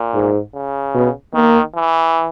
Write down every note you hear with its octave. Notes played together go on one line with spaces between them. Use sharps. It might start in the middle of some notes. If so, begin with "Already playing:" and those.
Already playing: A#2
G#2
C#3
B2
D#3 A#3
E3